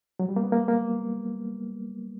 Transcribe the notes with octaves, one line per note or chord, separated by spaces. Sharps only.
F#3
G3
A#3
B3
A#3
A#3